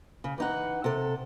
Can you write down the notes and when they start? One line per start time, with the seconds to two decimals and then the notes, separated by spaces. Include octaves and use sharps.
0.24 C#3
0.38 E3 D#4 F#5
0.84 C3 A4